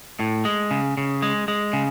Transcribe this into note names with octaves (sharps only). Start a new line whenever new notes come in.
A2
G#3
C#3
C#3
G#3
G#3
C#3